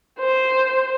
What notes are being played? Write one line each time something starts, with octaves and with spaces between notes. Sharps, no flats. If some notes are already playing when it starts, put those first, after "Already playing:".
C5